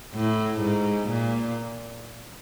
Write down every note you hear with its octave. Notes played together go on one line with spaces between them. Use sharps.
A2
G#2
A#2